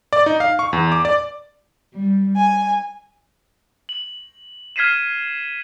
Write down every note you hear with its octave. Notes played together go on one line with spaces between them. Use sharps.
D5
D#4
F5
C#6
E2
D6
D5
G3
G#5
F#7
F6 G#6 B6 C7 D#7 E7